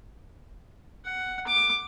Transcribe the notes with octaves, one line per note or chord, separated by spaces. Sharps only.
F#5
D6